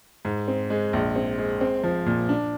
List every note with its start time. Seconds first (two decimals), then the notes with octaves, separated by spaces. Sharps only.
0.25 G#2
0.48 C4
0.70 G#3
0.93 A#1
1.16 C4
1.38 G#3
1.61 C4
1.84 F3
2.06 A#2
2.29 D4